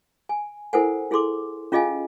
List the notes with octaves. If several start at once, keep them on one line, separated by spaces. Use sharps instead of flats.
G#5
E4 A4 A#4 C5 F#5 G#5
E4 G#4 A4 C6 D6
C#4 F4 G#4 D#5 F5 G#5